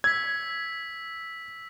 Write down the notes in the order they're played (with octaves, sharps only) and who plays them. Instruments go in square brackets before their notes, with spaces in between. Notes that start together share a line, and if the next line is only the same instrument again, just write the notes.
[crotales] E6 B6 [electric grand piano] G#6